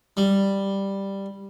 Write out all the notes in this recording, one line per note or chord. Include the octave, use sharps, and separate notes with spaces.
G3